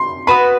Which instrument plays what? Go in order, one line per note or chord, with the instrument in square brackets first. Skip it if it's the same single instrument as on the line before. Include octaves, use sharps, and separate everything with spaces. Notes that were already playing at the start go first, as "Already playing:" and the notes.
Already playing: [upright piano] C6
[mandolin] B3 F#4 B4 [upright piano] B5